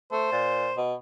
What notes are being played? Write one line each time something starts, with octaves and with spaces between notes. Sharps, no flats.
A3 C5
A#2
B2